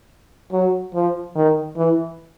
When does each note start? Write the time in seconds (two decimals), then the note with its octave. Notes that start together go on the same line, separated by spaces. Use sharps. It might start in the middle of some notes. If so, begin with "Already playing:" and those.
0.52 F#3
0.94 F3
1.35 D#3
1.77 E3